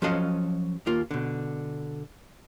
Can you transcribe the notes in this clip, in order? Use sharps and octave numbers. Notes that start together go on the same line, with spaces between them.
F3 F#3 C#4 A4 D#5 F5
D#2 A#3 F4
B2 D3